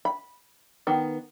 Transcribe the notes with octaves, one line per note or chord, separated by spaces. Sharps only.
B5
D#3 B3